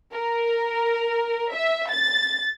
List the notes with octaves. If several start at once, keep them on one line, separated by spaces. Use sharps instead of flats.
A#4
E5
A6